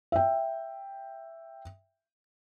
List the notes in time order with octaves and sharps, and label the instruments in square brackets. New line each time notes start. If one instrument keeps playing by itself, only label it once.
[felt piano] E5 G5